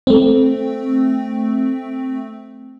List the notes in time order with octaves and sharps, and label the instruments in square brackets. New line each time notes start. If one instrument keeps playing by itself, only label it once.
[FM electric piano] A3 C4